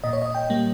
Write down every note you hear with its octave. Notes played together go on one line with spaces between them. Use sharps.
A#2 D#5
C#5
D#5
G5
G3 A#3